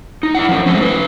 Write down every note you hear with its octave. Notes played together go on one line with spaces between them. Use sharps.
D#4
E4 F#4 D5 F#5
F3 C#4
G#3 A3 C4 C#4
D#4 B4